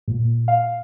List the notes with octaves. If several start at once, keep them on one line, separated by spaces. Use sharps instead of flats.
A#2
F5